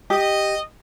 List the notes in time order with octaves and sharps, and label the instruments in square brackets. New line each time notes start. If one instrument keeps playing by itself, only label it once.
[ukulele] G4 [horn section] D#5